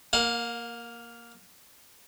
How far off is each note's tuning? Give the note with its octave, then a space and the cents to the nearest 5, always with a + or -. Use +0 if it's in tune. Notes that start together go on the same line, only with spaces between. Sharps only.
A#3 +0 F5 +35